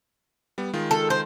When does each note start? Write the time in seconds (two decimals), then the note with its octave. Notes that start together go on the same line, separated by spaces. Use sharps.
0.58 G3 B3
0.73 D#3 G#3 F4
0.91 A4
1.10 C5